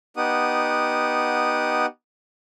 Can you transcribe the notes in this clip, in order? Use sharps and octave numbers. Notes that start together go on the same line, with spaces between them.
B3 D#4 G4 F#5 D#6